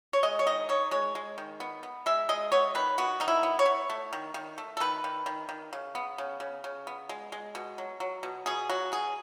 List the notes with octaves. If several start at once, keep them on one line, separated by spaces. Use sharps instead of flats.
C#5
G#3 D#5
C#5
D#3 D#5
D#3 C#5
G#3 C#5
G#3
D#3
B3
B3
G#3 E5
G#3 D#5
B3 C#5
D#3 B4
B3 F#4
D#3 D#4
E4
B3
C#5
B3
A3
D#3
D#3
A3
A4
D#3 B4
D#3
D#3
D#3
C#3
B3
C#3
C#3
C#3
B3
G#3
G#3
B2
F#3
F#3
B2
B2 G#4
F#3 F#4
B2 G#4